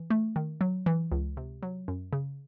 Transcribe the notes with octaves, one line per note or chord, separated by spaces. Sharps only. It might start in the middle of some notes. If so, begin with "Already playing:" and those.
Already playing: E3
A3
D#3
F#3
E3
C#2
C3
F#3
F#2
C#3